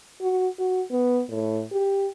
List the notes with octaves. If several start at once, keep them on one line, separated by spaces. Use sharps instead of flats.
F#4
F#4
B3
A2
G4